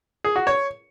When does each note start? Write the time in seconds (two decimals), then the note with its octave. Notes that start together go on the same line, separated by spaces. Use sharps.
0.24 G#4
0.36 F#4
0.47 C#5